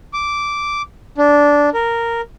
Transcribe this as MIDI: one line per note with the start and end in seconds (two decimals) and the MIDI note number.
0.13 0.82 86
1.18 1.70 62
1.74 2.21 70